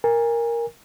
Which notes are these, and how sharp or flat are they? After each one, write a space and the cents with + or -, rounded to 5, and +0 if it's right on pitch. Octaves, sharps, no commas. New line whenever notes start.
A#4 +0 G#5 -30